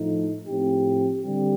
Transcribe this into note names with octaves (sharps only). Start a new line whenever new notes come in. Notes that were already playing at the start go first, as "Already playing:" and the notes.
Already playing: A2 F3 A3 D#4
A2 F3 C4 G4
D3 G3 C4 G4